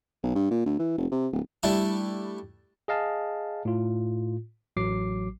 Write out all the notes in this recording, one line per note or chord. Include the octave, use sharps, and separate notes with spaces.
B1
G2
A#2
D2
E3
F1
C3
D1
G3 A3 D4 E4 A5
G#4 D#5 F5 A5
A2 F4
A1 F#3 D6 C7